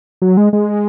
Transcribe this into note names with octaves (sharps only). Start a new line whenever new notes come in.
F#3
G#3
G#3